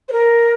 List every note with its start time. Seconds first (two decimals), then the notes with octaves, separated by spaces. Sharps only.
0.09 C5
0.12 A#4